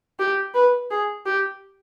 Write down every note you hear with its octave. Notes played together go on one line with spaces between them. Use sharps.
G4
B4
G#4
G4